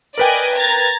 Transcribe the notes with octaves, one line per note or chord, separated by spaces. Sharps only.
A#4 B4 D5 D#5 G5 G#5
A#5 G#6 A6